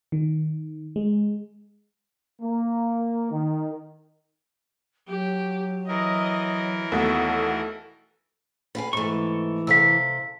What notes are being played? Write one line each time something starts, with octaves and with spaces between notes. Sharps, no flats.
D#3
G#3
A#3
D#3
F#3 G4
E3 A#4 D#5
D#2 B2 A3 A4 F#5
B4 F5 G#5
G#2 E3 A3 C#6
C3 A4 F5 E6 B6